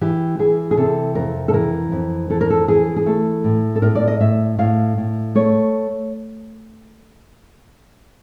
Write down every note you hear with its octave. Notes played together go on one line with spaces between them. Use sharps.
E3 G4
E3 G#4
G#4
C3 A4
F2 A#4
A4
E3 A#4
F2
E3 A4
A#4
A4
E3 G#4
G#4
A3 A4
A2
A4
A2 A#4
D5
D#5
A2 E5
A2 F5
A2
A3 C#5